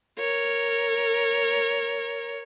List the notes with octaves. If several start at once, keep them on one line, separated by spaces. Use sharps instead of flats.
A#4 C#5